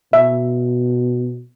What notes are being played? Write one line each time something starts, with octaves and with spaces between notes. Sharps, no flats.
B2 E5